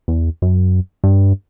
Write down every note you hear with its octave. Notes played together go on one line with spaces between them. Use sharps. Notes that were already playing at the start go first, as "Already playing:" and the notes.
E2
F#2
G2